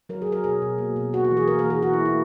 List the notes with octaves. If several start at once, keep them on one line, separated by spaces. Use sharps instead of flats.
F#3 A#4
G#4
F#3
A#4
B2 G#4
B2
A#3
B2
A#3 F#4
F#4
E3
G#4
A#3 A#4
A#4
E3
G#4
A#3 F#4
E4
A#3
E4